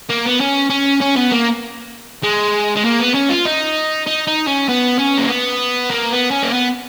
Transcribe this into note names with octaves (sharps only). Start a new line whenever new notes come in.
A#3
B3
C#4
C#4
C#4
B3
A#3
G#3
G#3
A#3
B3
C#4
F4
D#4
D#4
D#4
C#4
B3
C#4
A#3
B3
A#3
B3
C#4
A#3
B3